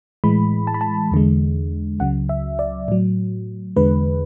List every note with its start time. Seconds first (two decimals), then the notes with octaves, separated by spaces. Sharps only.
0.24 A2 E3 G#3 B5
0.67 A5
0.74 B5
0.81 A5
1.12 E2 D3 G#3
2.00 C#2 C#3 F#3 F#5
2.29 E5
2.59 D5
2.88 A2 F#3
3.76 E2 D3 G#3 B4